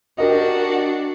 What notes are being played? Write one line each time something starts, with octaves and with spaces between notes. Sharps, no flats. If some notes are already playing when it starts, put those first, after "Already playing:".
D4 F#4 G4 A#4 D#5